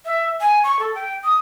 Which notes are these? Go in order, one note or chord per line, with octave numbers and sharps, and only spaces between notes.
E5
G#5
C#6
A4
G5
D#6